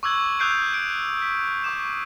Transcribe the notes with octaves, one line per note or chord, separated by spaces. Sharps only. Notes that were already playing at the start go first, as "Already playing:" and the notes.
C#6 D6 E6 F#6 G#6 F#7
D#6 E6 F#6 G6 C7 D7
D7
B6
C#6 D6 E7